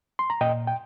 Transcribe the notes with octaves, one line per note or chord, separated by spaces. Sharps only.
C6
A#5
A#2 D#5 G5
G5